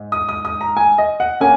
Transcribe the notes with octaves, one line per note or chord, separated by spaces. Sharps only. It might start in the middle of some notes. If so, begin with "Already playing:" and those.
Already playing: G#2
D#6
D#6
D#6
A#5
G#5
D#5
F#5
A#3 C#4 G#5